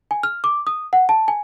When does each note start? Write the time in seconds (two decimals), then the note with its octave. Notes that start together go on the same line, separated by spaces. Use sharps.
0.11 G#5
0.23 F6
0.44 D6
0.67 D#6
0.93 F#5
1.09 A5
1.28 G#5